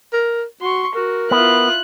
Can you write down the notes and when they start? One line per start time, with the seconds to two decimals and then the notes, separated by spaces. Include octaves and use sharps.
0.13 A#4
0.62 F#4 C6 C#6
0.95 F#4 A#4
1.31 B3 E4 F4 F#6